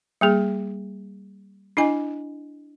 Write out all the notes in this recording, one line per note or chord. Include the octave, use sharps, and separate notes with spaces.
G3 A#3 G#4
D4 E4 D#5 G#5